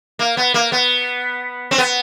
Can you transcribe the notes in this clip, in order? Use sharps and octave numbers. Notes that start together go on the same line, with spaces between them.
A#3
B3
A#3
B3
C4
B3